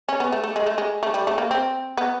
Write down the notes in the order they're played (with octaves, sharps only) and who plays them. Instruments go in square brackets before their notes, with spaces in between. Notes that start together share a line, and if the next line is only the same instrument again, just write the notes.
[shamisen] C#4
B3
A3
A3
G#3
A3
G#3
A3
G3
A3
A#3
C4
B3